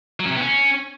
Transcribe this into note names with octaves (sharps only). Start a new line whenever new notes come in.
F#3
C#4
C3
B3
C#4